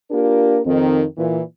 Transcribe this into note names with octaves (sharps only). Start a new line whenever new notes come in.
A#3 D4 F4 G4 A#4
F2 D#3 C4
A#2 E3